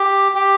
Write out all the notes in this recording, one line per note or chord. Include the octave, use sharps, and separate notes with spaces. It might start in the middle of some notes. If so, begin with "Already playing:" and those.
Already playing: G4
G4